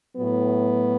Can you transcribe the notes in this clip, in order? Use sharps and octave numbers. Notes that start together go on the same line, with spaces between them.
A2 F#3 B3